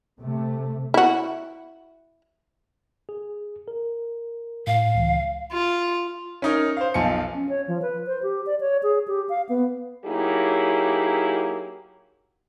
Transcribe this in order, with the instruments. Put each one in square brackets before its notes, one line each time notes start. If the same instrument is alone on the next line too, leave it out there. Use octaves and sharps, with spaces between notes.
[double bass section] C3 A3
[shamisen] E4 F#4
[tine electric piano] G#4
A#4
[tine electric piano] A2 [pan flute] F5
[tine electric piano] C#2 E3
[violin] F4
[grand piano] C#4 D#4 A#4
C5 F5
B1 F3 F5 G#5 A5 C#7
[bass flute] C#4
C#5
F3
B4
C5
G4
D5
C#5
G#4
G4
F5
B3
[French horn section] F#3 A#3 D#4 E4 G4 G#4